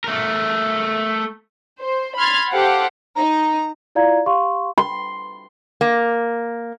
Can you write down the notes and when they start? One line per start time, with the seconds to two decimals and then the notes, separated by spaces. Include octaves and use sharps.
0.04 A3 A#4
1.78 C5
2.16 B5 C6 F6 G#6 A6
2.50 G4 A4 C5 F5 F#5
3.15 D#4 A#5
3.95 E4 F4 D5 F5 A#5 G#6
4.26 G4 F5 C6 C#6
4.78 C6
5.81 A#3